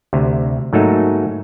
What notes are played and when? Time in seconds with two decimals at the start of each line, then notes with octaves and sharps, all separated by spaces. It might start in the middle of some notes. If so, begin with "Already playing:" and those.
0.13 D2 C3
0.73 G#2 F#3 A3 A#3 D#4 F#4